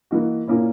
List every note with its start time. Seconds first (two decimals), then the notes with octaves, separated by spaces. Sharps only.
0.11 E3 A#3 D#4 F#4
0.47 A#2 A#3 C#4 E4